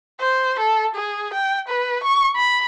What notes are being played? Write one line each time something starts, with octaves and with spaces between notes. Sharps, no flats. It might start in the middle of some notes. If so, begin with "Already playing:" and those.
C5
A4
G#4
G5
B4
C#6
B5